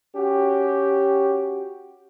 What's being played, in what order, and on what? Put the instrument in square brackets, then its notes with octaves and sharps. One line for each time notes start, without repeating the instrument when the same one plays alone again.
[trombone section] C#4 F#4 G4